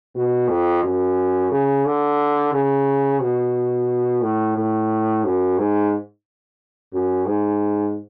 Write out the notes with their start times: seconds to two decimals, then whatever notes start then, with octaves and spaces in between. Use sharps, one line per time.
0.15 B2
0.48 F2
0.83 F#2
1.51 C#3
1.85 D3
2.53 C#3
3.20 B2
4.22 A2
4.56 A2
5.25 F#2
5.59 G#2
6.93 F#2
7.27 G#2